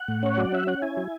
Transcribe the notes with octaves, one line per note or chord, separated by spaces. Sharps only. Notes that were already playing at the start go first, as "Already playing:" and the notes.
Already playing: F#5
A2
C#4 C#5
F#3 D5
C#4 E5
C#4 F#5
E4 G#5
F#3